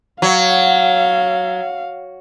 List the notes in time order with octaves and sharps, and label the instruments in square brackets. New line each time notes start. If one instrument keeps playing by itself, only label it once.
[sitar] F#3 [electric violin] F5